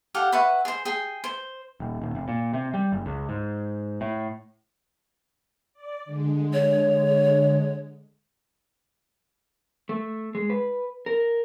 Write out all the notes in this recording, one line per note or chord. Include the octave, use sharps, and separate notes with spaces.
G4 A4 F5 F#5
B4 E5 F#5 C#6
G#4 C5
G#4 G5
C5
D#1
D#1
F1
A#2
C3
G3
F#1
C#2
G#2
A2
D5
D3 G#3
C#5
A3
G#3
B4
A#4